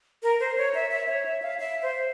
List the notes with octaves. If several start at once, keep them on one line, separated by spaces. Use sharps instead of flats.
A#4
C5
C#5
E5
E5
C#5
E5
F5
E5
C5